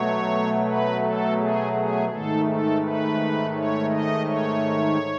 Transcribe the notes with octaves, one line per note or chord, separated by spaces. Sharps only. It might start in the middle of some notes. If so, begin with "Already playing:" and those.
Already playing: B2 F#3 A3 C#5
B4
A4
G#4
G#4
G#2 D#3 A3 A4
A4
B4
C#5
D#5
C#5